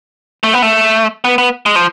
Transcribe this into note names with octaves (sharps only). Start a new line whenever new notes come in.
A3
B3
A3
B3
B3
G#3
F3